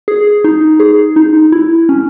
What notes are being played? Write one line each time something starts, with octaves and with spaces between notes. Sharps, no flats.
G#4
D#4
G#4
D#4
E4
C#4